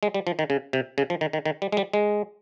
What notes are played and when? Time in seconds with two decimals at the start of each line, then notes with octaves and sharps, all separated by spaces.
0.03 G#3
0.14 G3
0.27 F3
0.39 D#3
0.50 C#3
0.73 C3
0.98 C#3
1.10 F3
1.21 D#3
1.33 D#3
1.45 D#3
1.62 G3
1.72 G#3
1.77 G3
1.93 G#3